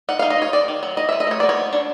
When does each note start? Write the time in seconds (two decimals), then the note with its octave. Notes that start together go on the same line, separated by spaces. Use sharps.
0.09 D#4 F#5
0.19 F5
0.22 D#4
0.30 D#5
0.38 D#4 C#5
0.53 D#3 D5
0.68 D#3
0.83 F#3
0.97 E3 D#5
1.09 E5
1.12 E3
1.20 D#5
1.27 A3 C#5
1.40 B3 D5
1.49 C#5
1.57 B3
1.73 D4